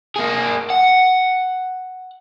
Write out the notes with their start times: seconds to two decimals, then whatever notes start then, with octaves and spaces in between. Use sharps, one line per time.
0.16 A#3 G#4
0.70 F#5